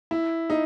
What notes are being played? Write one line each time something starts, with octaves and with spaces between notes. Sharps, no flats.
E4
D#4